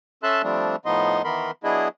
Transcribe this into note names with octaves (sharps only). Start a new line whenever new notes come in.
C#4 A4 E5 A5 C6 F#6
F3 G3 A3 C4 D4
A2 F3 B3 D#4 D#5 C6
D#3 E3 B3 A#4 B5 C6
F#3 B3 D4 E4 G#4 D#5